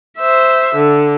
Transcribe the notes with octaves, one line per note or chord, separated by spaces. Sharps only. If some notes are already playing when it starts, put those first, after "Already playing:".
C5 E5
D3